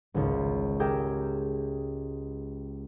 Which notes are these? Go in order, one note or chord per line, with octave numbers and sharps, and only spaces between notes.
G#1 C#2
G4 G#4 A#4 E5 G5